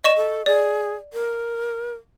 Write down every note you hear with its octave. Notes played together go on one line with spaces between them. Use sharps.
D5 D#5 C#6 E7
A4
G#4 D5
A#4